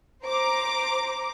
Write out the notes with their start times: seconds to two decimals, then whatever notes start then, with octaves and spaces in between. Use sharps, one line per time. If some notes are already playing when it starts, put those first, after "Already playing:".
0.25 C5 A#5 D6